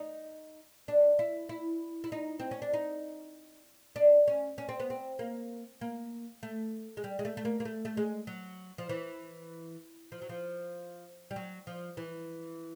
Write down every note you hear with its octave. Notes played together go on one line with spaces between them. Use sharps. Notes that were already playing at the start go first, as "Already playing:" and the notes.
Already playing: D#4
D4
E4
E4
E4
D#4
C4
C#4
D4
D#4
D4
C#4
C#4
C4
B3
C4
A#3
A#3
A3
G#3
G3
G#3
A3
A3
A#3
A#3
A3
A3
G#3
F#3
F3
E3
F3
F#3
F3
G3
F#3
F3
E3